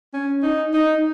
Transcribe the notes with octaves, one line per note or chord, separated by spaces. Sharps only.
C#4
D#4
D#4